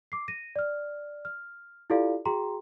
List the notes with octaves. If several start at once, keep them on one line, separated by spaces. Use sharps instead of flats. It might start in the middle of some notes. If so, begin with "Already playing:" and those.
D6 C7
A#6 D#7
D5 F6
F6
E4 F4 G4 A4 D5 F5
F#4 G#4 G5 A#5 C6